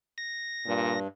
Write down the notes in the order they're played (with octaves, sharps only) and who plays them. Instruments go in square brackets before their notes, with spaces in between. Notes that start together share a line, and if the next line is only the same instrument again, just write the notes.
[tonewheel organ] A#6
[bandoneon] G2 [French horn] A#2